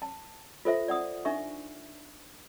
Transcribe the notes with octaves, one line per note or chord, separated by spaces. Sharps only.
A5
F4 A4 C5 E5
D5 F#5 D#6
D4 D#4 E5 C#6